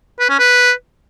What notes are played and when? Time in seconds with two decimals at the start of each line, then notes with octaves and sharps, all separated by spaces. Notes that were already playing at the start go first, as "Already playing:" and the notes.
0.20 B4
0.30 C#4
0.39 B4